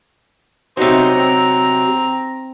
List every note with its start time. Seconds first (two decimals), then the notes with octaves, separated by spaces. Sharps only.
0.77 C3 F#3 D#4 C5
1.12 C4 A#5